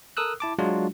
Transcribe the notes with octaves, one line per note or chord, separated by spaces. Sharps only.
A4 A#4 D#6 E6 F#6
E4 A5 D6
F#3 G#3 D4 F4 F#4